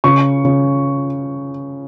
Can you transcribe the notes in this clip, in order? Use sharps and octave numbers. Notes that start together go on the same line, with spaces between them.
C#3 C#6
C#3